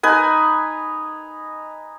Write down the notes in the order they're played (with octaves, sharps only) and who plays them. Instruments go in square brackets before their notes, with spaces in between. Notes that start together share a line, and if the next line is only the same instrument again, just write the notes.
[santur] D#4 B4 G#5